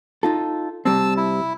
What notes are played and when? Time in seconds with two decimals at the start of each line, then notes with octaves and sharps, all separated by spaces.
0.23 D#4 F4 A4
0.85 C2 G3 C4 A5 E6
1.17 E4